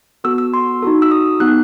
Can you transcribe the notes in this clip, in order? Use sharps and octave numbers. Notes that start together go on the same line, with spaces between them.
B3 F#4 A4 E6
E6
C6
D#4 F#4 A4
E6
D#6
B3 D#4 G4 F#6